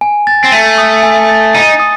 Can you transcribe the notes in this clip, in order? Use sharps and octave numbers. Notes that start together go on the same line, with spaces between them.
G#5
A6
C4
A3 D#7
D#6
G#5
A6
D#4 D#7
D#6